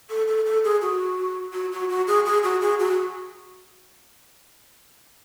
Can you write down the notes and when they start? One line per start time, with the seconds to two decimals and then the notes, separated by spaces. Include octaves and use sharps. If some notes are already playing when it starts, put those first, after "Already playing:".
0.10 A4
0.28 A4
0.46 A4
0.64 G#4
0.81 F#4
1.53 F#4
1.72 F#4
1.89 F#4
2.07 G#4
2.26 G#4
2.44 F#4
2.62 G#4
2.79 F#4